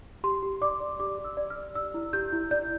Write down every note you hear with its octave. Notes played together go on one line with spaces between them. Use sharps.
G4 C6
G4
D5 D6
D5
G4 D6
G4
E6
D5
F6
D5
D5 E6
E4
G4 G6
E4
D5 G6